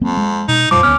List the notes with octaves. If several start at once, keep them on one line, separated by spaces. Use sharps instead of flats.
F2 F#3 A#3 C4
G#3
B2 D#4
F2 A#2 F3 G3 D6
D2 B3 C#4 F6